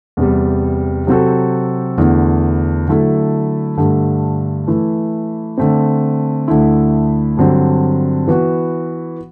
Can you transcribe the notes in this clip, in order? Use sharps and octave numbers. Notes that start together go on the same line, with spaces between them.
E2 C3 G3
C3 F#3 C4 F#4 A4
E2 D3 A3 E4
D3 F#3 A3 E4 A4
G2 D3 A3
E3 A3 E4
D3 A3 C4
D2 D3 A3 E4
G2 D3 F#3 C4
E3 B3 F#4